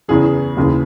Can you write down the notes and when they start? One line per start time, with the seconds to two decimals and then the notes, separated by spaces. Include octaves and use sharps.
0.08 E2 C#3 E3 G#4
0.57 D#2 C#3 E3